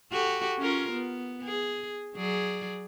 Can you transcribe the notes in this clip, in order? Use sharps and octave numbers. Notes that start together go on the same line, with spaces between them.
F#4 G4 A4
C#4 F4 A#4
B3
G#4
F#3 G#4 D5